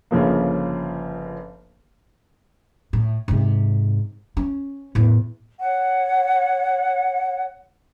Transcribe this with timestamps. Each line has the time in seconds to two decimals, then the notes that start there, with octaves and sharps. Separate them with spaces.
0.11 G1 C#3 F3 A#3
2.93 A2
3.28 G#2 C3
4.37 C#4
4.95 E2 A2
5.61 C#5 F#5